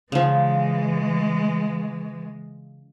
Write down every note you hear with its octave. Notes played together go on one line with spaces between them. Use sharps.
C#3 E3 F3 G#3